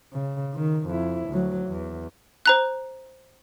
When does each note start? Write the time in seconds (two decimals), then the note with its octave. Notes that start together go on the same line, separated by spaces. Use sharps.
0.13 C#3
0.55 D#3
0.87 F2 E4
1.29 D2 F#3
1.68 E2
2.46 C5 A#5 F#6